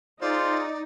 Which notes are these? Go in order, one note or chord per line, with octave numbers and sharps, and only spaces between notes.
D#4 F4 G#4 C5 D5